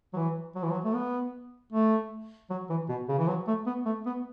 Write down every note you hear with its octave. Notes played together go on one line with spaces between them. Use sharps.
F#3
E3
F#3
E3
F#3
A3
B3
A3
F#3
E3
B2
C#3
E3
F#3
A3
B3
A3
B3